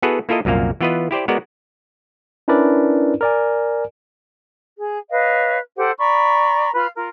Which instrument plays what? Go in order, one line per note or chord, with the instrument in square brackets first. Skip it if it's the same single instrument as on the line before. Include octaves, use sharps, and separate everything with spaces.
[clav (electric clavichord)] B3 E4 F#4 G#4 A4 B4
A#3 E4 F4 A4 A#4 D#5
C2 F#2 A#2 A#3 F5
E3 B3 F4 B4 D#5
E4 G4 C5 D5
G#3 B3 F#4 A#4 D5
[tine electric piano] C#4 D4 E4 A#4 B4 D5
A#4 D5 G#5
[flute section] G#4
B4 C#5 D#5 F5
G4 A4 C5 F#5
D5 A#5 B5 C#6
F4 B4 F5
F4 A#4